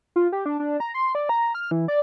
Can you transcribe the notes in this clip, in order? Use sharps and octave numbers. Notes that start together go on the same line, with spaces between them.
F4
G4
D4
D4
A#5
C6
D5
A#5
F6
E3
D5